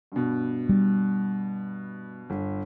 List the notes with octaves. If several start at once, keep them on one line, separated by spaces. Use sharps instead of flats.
G2 B2
G3
G1